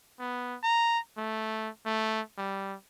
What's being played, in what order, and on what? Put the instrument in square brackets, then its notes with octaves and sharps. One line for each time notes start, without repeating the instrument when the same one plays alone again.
[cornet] B3
A#5
A3
A3
G3